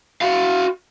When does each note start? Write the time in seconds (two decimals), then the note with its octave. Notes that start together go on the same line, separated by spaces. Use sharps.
0.21 F#4 F5